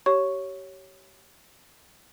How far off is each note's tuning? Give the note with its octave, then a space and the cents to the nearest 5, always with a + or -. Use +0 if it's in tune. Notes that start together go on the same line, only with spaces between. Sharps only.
G4 -30 C#5 +0 C#6 +0